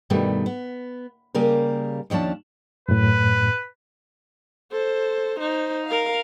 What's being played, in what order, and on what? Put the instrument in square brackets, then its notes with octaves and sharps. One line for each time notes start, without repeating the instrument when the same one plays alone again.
[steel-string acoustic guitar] G2 B2 D#3 G3 A3
B3
C#3 G3 A#3 A#4
D#2 F3 C#4 D4 A5
[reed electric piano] F#2 A2 [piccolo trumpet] B4
[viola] A4 C5
D#4 C5
A#4 F5